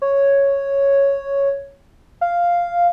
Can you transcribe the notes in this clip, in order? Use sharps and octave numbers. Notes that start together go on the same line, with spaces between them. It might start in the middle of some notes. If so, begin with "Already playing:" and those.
C#5
F5